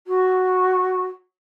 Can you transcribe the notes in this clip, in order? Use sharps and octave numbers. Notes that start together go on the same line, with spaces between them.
F#4